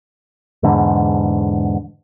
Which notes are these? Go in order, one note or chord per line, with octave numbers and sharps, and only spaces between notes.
E2 G#2 D3